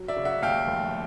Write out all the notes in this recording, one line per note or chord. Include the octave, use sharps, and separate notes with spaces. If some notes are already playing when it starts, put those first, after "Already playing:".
Already playing: F#3
D5 E5
C#3
E5 F#5
D#2 F5 G5
F1